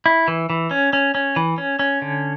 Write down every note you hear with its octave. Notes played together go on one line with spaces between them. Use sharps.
E4
E3
E3
C#4
C#4
C#4
E3
C#4
C#4
D3